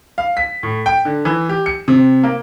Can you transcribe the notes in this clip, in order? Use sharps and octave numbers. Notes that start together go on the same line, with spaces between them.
F5
B6
A2
G5
D3
E3
G4
C#7
C3
A#3